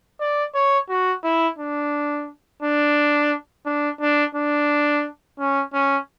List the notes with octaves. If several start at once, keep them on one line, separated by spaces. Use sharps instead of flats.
D5
C#5
F#4
E4
D4
D4
D4
D4
D4
C#4
C#4